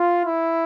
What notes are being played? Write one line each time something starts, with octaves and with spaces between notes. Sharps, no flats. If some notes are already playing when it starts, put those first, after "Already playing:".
Already playing: F4
E4